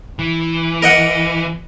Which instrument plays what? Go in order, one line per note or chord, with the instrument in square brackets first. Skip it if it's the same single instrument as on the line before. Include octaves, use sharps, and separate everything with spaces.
[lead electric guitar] E3
[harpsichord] A#4 D#5 F#5